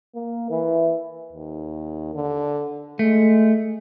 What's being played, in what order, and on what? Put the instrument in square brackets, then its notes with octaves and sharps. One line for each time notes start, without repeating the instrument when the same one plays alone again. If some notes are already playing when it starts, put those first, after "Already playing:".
[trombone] A#3
E3
[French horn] D#2
D3
[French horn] G#3 [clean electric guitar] A3